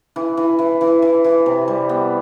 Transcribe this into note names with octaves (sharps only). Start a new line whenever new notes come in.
E3
E3
E3
E3
E3
E3
C3
G3
B3